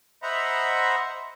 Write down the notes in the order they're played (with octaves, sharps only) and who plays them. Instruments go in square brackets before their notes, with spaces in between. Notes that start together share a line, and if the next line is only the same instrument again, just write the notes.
[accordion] C5 D#5 E5 F#5 A#5 B5